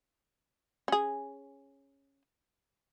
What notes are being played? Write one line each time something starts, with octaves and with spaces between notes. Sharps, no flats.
C#4 G#4